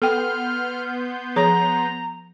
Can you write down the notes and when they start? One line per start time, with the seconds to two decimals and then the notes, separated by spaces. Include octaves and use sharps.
0.02 B3 A4 G5 C6 F6 G6
1.36 F3 G#4 C#5 A#5